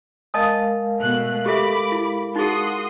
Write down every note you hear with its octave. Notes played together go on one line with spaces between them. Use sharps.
G#3 A#4 D#5 F5 A5 D#6
B2 A3 F#6
G4 A4 E5 B5 D6
E4
D#4 F#4 G#4 C6 D#6